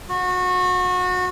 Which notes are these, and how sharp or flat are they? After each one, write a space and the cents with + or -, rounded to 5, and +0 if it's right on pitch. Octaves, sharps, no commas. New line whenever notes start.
F#4 -25